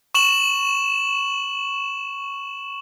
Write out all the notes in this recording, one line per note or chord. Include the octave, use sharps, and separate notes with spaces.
C#6 E7 F#7